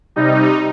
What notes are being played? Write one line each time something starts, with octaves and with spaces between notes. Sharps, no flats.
C3 G3 D#4